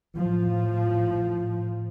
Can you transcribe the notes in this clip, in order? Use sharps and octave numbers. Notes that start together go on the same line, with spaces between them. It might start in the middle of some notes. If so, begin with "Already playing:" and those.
A2 F3